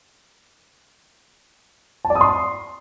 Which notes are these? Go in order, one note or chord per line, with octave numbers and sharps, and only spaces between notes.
A5
D5
D#6
C6